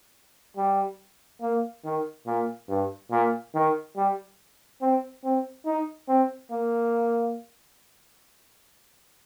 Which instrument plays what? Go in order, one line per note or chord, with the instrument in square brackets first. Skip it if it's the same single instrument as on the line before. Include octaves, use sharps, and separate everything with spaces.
[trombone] G3
A#3
D#3
A#2
G2
A#2
D#3
G3
C4
C4
D#4
C4
A#3